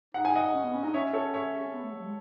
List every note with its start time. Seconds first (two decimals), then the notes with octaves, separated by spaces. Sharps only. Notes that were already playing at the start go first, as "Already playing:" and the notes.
0.14 D#4 F#5
0.25 G#5
0.35 D#5 F#5
0.54 C#4
0.64 B3
0.74 C#4
0.83 D#4 D#5
0.94 C#4 C#5 E5
1.13 A4 C#5
1.34 C#5 E5
1.67 C#4
1.73 B3
1.83 A3
1.93 F#3
2.03 G#3